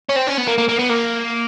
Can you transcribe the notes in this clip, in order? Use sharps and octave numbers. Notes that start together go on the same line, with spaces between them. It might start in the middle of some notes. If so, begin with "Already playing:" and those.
C#4
C4
C#4
B3
A#3
A#3
A#3
B3
A#3